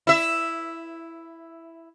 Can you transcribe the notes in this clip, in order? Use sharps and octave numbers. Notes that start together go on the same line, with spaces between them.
E4 E5